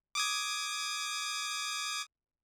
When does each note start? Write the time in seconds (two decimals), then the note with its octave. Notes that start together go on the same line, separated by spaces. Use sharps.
0.15 D6 D#6 G#6